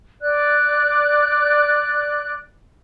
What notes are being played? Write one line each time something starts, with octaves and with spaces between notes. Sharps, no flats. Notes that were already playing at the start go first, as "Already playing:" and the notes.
D5 F#6